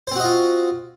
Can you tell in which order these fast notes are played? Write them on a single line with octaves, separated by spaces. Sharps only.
C5 C4 F#4 D#5 F4